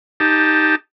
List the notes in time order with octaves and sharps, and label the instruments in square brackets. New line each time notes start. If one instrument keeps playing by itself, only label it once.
[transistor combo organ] D#4 G4 A5